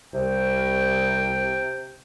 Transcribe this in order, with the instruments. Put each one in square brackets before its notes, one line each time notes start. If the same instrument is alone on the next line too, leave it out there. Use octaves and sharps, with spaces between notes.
[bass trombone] C2 [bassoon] C3 [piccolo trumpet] G5